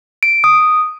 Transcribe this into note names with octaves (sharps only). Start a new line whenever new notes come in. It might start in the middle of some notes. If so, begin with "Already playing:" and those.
D7
D#6